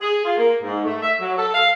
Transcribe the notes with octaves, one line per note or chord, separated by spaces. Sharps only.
G#4
F4
A#3
G#2
A3
E5
F#3
A4
F5